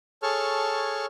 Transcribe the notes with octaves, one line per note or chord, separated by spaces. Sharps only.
G#4 A4 C#5 A5 C#6 F6